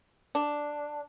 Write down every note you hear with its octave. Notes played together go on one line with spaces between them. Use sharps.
D4